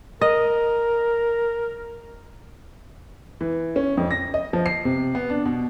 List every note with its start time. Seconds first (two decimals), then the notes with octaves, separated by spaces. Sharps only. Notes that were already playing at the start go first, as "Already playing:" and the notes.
0.21 A#4 D#5
3.41 E3
3.76 C#4
3.97 F2
4.11 A#6
4.34 D#5
4.53 F3
4.66 C7
4.85 C3
5.15 B3
5.30 D4
5.45 B2